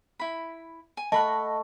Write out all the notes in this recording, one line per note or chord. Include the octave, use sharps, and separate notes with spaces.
E4 B5
G#5
A3 D#5 F#5 A5 B5 C#6